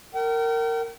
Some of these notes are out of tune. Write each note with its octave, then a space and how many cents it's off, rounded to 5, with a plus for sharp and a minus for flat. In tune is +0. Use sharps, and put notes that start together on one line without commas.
A#4 -20 G5 -45